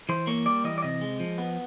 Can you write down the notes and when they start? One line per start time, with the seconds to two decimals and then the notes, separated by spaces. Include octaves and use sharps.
0.09 E3 C5
0.27 A#3 C#5
0.46 G3 D5
0.64 E3 D#5
0.78 D5
0.83 C3 D#5
1.01 G#3
1.20 F3
1.38 B3